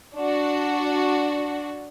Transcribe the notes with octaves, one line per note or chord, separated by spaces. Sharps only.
D4 F#4